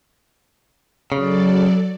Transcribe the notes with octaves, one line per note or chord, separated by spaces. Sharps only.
C#3 F#3 A4 D5